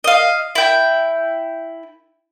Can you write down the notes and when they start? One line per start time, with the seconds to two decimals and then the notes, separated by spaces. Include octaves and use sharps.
0.04 D#5 F5
0.55 E4 G5